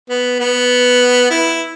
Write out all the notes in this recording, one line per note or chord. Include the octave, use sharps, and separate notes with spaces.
B3
B3
E4